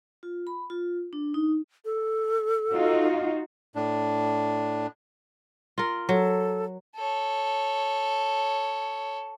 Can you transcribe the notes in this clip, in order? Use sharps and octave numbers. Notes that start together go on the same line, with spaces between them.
F4
B5
F4
D4
D#4
A4
D#4 F4 F#4
A2 D4
F4 A#4
F#3 A4
A4 C#5